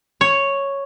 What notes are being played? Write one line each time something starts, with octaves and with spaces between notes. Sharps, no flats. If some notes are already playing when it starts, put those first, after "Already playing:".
C#5